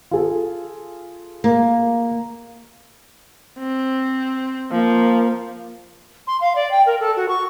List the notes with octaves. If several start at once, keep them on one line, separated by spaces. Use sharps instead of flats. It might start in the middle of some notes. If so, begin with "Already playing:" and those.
F4 G#4 A4
A#3
C4
F3 A#3
C6
F5
D5
G5
A#4
A4
F#4
C#6